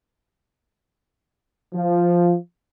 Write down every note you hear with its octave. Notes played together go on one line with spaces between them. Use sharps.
F3